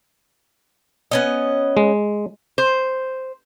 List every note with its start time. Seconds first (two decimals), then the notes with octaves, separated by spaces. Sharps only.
1.11 B3 C#4 D#5
1.77 G#3
2.58 C5